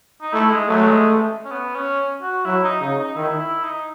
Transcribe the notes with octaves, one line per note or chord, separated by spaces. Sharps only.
D#4
A3 E4
G#3
F#3 A3
G#3
C#4
B3
C#4
F#4
F#3 E4
D#4
C#3 D#4
D#4
D#3 E4
E4
D#4